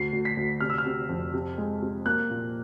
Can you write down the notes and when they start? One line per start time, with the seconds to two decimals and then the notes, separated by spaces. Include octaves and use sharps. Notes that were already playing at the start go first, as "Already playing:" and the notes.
Already playing: D2 C7
0.13 D2
0.25 B6
0.37 D2
0.60 C3 F6
0.70 E6
0.78 F6
0.86 C3
1.09 F2
1.34 C3
1.58 G#3
1.82 C3
2.06 A#3 F#6
2.30 A#2